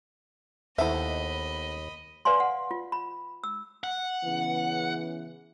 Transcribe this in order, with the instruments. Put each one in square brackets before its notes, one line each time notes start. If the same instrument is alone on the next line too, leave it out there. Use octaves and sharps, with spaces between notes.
[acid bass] D#2 [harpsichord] B3 A4 C5 [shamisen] E4 E5 [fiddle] D#5 B5
[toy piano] B4 D5 F5 G#5 C6
F#5
F4
B5
E6
[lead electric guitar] F#5
[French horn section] C#3 E3 B3